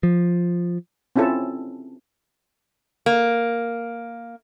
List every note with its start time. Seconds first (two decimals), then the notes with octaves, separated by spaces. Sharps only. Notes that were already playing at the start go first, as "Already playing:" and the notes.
0.03 F3
1.16 C4 C#4 E4 F4 A4
3.06 A#3